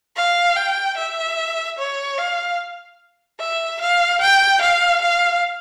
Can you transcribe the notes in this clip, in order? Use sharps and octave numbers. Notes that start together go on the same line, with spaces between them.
F5
G5
E5
C#5
F5
E5
F5
G5
F5
F5